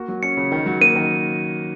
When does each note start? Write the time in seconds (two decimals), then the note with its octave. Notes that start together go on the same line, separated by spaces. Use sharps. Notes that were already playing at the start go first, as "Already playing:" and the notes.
Already playing: A#3 F#4
0.08 F#3
0.23 C#4 C#7
0.37 C#3
0.52 D#3
0.66 F#3
0.81 A#3 D#7
0.95 D#3